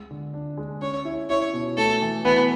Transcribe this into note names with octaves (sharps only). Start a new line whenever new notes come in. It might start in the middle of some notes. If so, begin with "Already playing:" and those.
Already playing: G#3
D3
D4
G#3
C#4 C#5
E4
E4 C#5
B2
A3 A4
E3
E3 B3